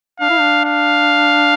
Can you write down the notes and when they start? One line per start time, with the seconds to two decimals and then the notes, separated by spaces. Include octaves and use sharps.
0.20 D4 F5
0.30 E4
0.40 D4
0.65 F5